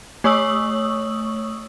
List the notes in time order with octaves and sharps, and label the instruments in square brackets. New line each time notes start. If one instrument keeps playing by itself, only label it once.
[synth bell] A3 C#5 C#6 D#6 E6 F#7